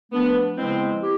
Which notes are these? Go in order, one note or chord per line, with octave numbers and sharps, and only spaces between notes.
F3 A3 B3 D4
C#3 F3 G#3 B3 C4 E4
E4 G4